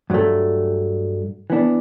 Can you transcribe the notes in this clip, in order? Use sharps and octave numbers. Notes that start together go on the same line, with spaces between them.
G2 F#3 A3
E3 B3 D4